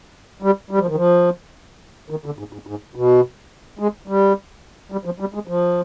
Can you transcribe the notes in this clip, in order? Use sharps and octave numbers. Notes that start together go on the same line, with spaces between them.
G3
G3
F3
D#3
F3
D#3
D3
G#2
G#2
G#2
B2
G#3
G3
G3
F3
G3
G#3
F3